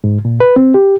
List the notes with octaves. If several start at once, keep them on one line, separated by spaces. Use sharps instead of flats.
G#2
A#2
B4
C4
G4